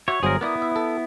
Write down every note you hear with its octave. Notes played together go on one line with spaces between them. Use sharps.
F#4 C#5 E5
G1 F#3 G#4 A#4 C5
B3 E4 A#4 D5 D#6
E5
A4